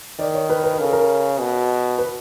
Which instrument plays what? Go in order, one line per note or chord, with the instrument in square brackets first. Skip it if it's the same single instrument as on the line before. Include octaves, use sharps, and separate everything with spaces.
[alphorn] D#3 [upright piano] D5
[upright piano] C#5
B4
B4
A#4
[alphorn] C#3 [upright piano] A4
[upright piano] A#4
[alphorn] B2
[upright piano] B4